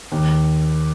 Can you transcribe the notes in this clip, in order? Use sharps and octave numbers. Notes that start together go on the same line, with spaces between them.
D#2